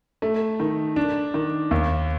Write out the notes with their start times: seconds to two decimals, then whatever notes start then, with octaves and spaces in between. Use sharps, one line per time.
0.22 A3
0.60 D#3
0.96 D4
1.34 D#3
1.71 D#2